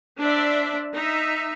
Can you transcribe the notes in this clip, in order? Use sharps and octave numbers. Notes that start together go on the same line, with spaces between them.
D4 C5 D5 E5
D#4 E5